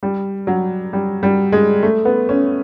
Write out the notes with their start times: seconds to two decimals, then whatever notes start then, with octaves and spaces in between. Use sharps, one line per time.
0.03 G3
0.47 F#3
0.93 G3
1.23 G3
1.52 G#3
1.83 A3
2.05 B3
2.29 C#4